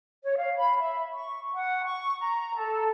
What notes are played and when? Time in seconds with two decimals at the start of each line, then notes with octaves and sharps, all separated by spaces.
0.23 C#5
0.38 F5
0.57 B5
0.79 E5
1.13 C#6
1.53 F#5
1.84 C#6
2.20 A#5
2.56 A4